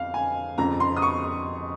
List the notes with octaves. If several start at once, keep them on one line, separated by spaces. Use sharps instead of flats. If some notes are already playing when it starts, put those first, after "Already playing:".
Already playing: F2 F5
G#5
F2 C#3 F3 A#5
C6
D#6
C#6